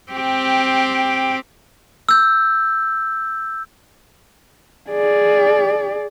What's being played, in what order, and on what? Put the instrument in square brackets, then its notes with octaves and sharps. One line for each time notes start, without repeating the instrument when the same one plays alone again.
[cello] C4 G4
[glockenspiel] E6 G6
[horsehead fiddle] G#4 D5